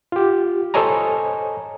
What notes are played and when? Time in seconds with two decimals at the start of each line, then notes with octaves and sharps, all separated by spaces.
0.12 F4 G4
0.74 A4 C5 C#5 D#5 G#5 A#5